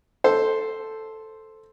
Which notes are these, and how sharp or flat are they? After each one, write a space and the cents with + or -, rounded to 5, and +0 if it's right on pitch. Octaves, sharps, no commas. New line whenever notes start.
A4 +0 C5 +0